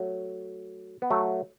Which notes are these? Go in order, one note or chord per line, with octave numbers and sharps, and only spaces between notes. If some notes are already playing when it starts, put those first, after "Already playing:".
Already playing: F#3 A3
B3
F#3 A3